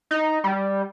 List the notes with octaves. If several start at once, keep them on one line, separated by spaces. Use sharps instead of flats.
D#4
G3